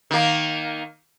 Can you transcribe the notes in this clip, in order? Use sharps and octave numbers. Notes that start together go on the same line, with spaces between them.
D#3 A#3